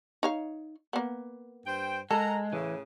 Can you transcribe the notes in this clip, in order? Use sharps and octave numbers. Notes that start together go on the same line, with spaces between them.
D#4 C#5 F5
A#3 B3
G2 C5 G5
G#3 A4 A#4 F#5 A#5
A2 C#3 E3